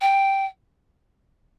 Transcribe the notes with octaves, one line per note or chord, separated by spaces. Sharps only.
G5